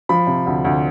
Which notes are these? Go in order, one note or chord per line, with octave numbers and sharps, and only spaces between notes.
F3 B5
C3
D2
D2